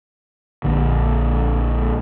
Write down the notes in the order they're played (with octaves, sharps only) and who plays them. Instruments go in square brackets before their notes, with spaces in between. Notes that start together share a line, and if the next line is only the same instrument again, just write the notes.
[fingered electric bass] A#1 D3